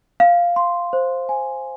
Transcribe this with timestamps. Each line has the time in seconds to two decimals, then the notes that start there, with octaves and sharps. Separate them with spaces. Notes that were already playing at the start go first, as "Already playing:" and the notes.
0.20 F5
0.56 C6
0.93 C5
1.29 G#5